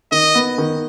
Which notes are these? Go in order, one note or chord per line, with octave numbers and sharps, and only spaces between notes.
D#3 D#5
B3
D#3